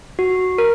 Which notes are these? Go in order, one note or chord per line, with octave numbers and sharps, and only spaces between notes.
F#4
A#4